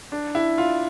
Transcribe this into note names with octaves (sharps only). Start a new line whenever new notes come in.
D4
E4
F4